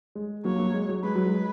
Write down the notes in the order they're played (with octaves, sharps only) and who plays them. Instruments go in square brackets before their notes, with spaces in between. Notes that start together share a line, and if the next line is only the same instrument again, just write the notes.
[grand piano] G#3
[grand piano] F#3 A#3 [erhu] C#5
[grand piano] F#3 A#3
G#3
F#3
[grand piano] G#3 [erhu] B4
[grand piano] F#3
G#3